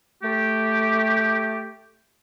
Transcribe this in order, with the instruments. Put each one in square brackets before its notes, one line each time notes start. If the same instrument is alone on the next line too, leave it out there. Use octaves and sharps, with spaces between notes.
[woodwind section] A3 G4